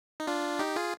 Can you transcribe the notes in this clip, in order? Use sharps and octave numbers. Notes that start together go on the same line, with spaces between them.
D#4
D4 F4
D#4 G4
F4 G#4